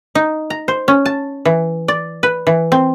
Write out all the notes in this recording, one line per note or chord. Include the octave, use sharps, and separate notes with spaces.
D#4
A#5
C5
C#4
A5
E3
D5
B4
E3
C4